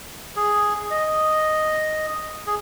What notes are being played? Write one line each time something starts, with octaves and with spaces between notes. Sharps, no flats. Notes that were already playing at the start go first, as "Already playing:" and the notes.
G#4
D#5
G#4